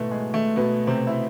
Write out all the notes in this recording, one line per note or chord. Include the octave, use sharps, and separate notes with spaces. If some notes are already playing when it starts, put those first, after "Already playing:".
Already playing: A1 G#2 B2 E3 A3 B3
G#3
A3
B2 B3
C3 C4
E4